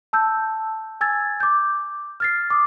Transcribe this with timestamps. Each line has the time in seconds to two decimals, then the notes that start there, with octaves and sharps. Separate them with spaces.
0.13 A5 E6 G6
1.01 G#5 E6 G#6 A6
1.40 D6 G6
2.20 F6 A6 C7
2.50 D6 D#6